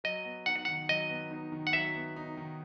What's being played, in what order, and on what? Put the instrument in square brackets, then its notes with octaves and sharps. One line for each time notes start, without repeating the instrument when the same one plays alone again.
[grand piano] F#3 [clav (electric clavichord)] D#5
[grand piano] B3
[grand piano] D#4 [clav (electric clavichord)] F#5
[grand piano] D#3 [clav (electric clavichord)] F#5
[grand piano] F#3 [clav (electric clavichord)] D#5
[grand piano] B3
D#4
D#3
[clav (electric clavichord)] F#5
[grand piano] F#3 [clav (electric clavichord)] E5
[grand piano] B3
D#4
D#3